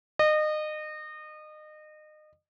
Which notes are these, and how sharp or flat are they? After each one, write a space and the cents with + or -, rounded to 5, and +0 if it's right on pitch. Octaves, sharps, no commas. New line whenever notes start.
D#5 -30